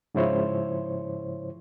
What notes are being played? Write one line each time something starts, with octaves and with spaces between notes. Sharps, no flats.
G#2 C#3 F3 E4 C5 C#5